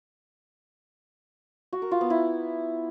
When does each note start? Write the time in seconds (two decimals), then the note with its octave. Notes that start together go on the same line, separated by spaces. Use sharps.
1.73 F#4
1.82 A#4
1.91 F4
2.01 B3
2.10 E4